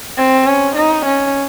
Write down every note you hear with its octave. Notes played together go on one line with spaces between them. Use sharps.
C4
C#4
D#4
C#4